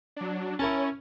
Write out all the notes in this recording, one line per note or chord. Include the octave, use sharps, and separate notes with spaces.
F#3 D4
C#4 E4 A#4 C#5 A5